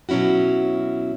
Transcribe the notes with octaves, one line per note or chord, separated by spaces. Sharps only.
B2 F#3 C#4 E4 F#4